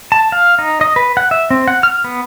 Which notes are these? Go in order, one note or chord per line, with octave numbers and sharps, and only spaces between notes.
A5
F5
D#4
D#5
B4
F#5
E5
C4
F#5
F6
B3